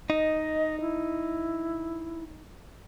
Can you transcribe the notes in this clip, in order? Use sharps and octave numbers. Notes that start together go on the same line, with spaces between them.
D#4 D#5
E4